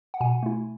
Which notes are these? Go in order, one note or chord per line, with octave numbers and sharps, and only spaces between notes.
F#5
B2 G#5
A3 E4